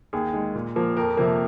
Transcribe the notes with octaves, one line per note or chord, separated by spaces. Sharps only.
D#2 G#4
D#3 G#3
A#2
F3 A#3
F2 A#4
C3 F3 A#3